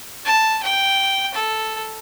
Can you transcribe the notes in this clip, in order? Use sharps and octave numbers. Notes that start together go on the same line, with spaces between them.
A5
G5
A4